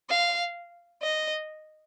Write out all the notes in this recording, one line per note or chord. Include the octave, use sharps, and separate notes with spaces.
F5
D#5